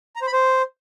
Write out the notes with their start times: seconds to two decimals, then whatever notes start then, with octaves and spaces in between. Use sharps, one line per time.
0.16 A#5
0.21 C5
0.27 B5
0.32 C5